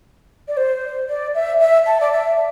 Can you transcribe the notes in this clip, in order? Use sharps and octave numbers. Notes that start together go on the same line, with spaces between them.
D5
C5
D5
E5
E5
A5
D5
E5